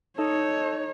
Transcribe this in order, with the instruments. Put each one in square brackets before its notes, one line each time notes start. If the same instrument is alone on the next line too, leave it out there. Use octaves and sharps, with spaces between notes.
[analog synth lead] D#4 [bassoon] A4 [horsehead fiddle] C#5